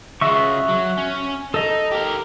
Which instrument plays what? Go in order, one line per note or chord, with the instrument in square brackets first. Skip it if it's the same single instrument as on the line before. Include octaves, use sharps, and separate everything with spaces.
[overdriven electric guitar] C#3 G#3 [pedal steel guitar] F#4 E5 C#6
[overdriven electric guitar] F#3
C#4
[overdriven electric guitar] D#4 [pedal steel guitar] A4 D#5
[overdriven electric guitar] G4 A#4